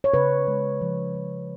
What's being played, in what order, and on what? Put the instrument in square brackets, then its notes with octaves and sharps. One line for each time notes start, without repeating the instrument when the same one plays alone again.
[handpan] C#5
C#3 B4
G#3
F3
F3